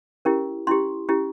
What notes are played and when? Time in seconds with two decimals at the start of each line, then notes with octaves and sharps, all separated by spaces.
0.25 C#4 E4 G4 A#4
0.67 C#4 E4 G4 C6
1.09 C#4 E4 G4